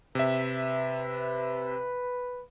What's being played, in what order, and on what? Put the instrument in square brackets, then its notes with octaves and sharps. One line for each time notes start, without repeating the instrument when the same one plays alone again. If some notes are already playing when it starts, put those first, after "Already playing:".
[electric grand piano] C3 E5 [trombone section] B4